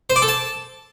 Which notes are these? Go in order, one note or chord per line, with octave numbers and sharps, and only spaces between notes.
C5
D5
A4
A5